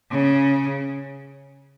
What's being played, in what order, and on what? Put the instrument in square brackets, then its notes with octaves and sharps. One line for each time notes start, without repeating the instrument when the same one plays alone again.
[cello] C#3